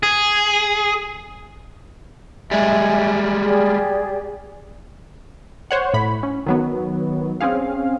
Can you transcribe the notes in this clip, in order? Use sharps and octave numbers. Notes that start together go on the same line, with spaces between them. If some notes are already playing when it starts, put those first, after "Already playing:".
G#4
G3 G#3 D#5 E5 G#5
G4 G#4 D5
C5 C#5 F#5
A2 B5
C#4
D#3 F#3 B3
C4 C#4 G#4 F5